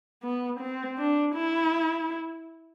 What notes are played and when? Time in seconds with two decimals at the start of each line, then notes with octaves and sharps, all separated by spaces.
0.23 B3
0.60 C4
0.98 D4
1.35 E4